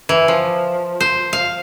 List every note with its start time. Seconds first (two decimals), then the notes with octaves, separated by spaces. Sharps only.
0.09 E3
0.28 F3
1.00 C5
1.33 F5